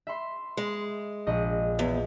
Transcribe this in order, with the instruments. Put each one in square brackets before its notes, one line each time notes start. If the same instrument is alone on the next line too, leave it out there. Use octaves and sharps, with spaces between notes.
[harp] E5 B5 C6
[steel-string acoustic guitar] G#3
[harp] A#1 D#5
[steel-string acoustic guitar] E2